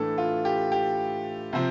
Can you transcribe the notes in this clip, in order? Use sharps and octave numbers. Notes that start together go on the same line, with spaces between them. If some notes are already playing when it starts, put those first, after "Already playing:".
Already playing: A2 E3 A3 D4 A4
F4
G4
G4
C3 F3 C4